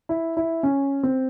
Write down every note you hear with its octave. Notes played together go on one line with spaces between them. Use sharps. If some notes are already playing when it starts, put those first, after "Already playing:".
E4
E4
C#4
C4